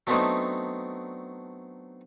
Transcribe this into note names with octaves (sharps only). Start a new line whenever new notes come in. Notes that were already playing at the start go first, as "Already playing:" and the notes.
F#3 A3 B3 C4 D4 D#4